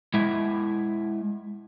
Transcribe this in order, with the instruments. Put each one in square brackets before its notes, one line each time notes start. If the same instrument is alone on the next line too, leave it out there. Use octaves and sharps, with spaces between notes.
[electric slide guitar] G#3 E4 E5